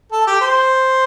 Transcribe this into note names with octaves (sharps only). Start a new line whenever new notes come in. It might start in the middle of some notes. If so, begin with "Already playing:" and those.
A4
G4
C5